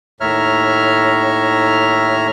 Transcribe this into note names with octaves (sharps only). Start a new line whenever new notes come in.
D#2 A2 C#5 E5 A#5 F6